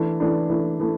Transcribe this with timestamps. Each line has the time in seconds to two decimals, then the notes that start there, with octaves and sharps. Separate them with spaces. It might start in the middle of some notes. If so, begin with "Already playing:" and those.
Already playing: E3 A3 D4
0.20 E3 A3 D4
0.50 E3 A3 D4
0.80 E3 A3